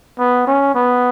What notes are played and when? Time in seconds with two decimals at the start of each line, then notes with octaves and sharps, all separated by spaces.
0.19 B3
0.47 C#4
0.75 B3